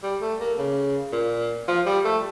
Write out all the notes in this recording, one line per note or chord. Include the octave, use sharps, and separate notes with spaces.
G3
A3
A#3
C#3
A#2
F3
G3
A3